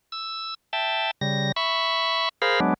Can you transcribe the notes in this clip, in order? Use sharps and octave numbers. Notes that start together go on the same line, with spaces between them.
E6
E5 G5 A5
C#3 G3 A#6
E5 B5 C#6
G#4 A#4 C5 F5 B5
F#3 G#3 B3 D4